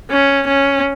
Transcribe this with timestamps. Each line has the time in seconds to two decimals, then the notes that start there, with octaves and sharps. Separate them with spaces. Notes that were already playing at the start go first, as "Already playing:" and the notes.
0.10 C#4
0.47 C#4